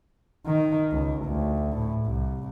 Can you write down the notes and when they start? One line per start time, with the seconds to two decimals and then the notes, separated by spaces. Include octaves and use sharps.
0.46 D#3
0.92 C#2
1.25 D2
1.76 A2
2.06 C2